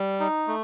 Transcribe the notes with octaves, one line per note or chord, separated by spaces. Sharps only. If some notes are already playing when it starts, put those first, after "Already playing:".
Already playing: G3
D#4
A3